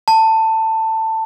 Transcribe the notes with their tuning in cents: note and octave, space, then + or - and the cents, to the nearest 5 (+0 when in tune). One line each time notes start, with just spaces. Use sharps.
A5 +15